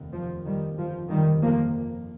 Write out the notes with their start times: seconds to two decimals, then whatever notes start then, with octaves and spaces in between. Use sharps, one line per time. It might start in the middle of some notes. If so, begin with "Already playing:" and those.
Already playing: F1 D#2
0.14 F3
0.45 D#3 G3
0.78 G1 F2 C3 F3
1.10 D#3 G3
1.42 F3 A#3